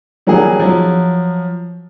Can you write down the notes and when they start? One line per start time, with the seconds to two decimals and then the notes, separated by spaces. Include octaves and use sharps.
0.27 D#3 F#3 G3 A#3 G#4
0.59 F3 F#3